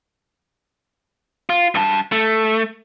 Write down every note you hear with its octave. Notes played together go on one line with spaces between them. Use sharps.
F4
G2 A5
A3